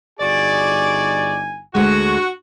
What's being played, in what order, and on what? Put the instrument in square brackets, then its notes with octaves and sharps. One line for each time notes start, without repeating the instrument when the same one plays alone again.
[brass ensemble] G1 D#4 G#5 [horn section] F#4 G#4 D5
[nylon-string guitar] D2 G#3 [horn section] F#4